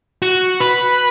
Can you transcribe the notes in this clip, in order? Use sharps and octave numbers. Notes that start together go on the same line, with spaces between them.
F#4
B4 B5